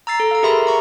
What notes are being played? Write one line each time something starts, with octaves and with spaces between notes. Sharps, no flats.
A#5 E6 A6 C7
A4
F5 A#5
G4 G#4 A#4 E5 B5 C6
A#5 C#6